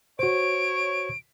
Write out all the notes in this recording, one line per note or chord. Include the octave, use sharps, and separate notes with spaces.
F#4 C5 C#5 D7